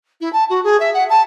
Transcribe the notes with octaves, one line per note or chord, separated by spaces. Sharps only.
E4
A5
F#4
G#4
E5
F#5
A5